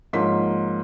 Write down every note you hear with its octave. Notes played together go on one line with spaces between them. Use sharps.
G#2 F3 A#3 C#5 C6 B6